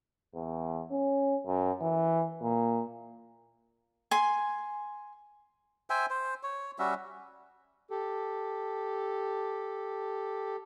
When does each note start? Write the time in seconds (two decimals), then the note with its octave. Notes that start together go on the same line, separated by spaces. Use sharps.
0.35 E2
0.91 C#4
1.46 F#2
1.81 E3
2.42 A#2
4.11 G#5 C6
5.90 C5 E5 G5 G#5
6.10 C5
6.43 C#5
6.79 G3 C#4 F#4 E5
7.91 G4 A4